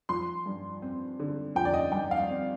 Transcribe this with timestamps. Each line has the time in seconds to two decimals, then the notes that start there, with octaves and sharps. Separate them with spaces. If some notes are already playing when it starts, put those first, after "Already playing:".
0.09 F3 C6
0.46 G2
0.82 C4
1.19 D3
1.55 F3 G5
1.65 D5
1.74 D#5
1.92 G2 G5
2.11 F5
2.29 C4